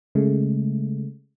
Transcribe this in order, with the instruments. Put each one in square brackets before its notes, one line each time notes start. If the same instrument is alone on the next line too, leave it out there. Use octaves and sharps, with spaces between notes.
[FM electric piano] C#3 G#3 A3